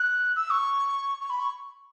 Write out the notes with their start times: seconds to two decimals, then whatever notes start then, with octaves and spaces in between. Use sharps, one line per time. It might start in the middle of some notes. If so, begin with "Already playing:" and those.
Already playing: F#6
0.36 E6
0.51 C#6
1.20 C#6
1.30 B5
1.40 C#6